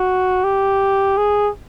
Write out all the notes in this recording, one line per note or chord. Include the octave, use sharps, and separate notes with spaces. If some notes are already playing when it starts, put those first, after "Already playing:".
Already playing: F#4
G4
G#4